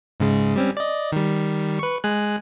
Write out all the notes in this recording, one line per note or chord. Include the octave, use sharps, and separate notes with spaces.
G#2 C#3 G#3
G3 C4 C#4
D5 D#5
D#3 G3
B4 C#6
G#3 G#5 F#6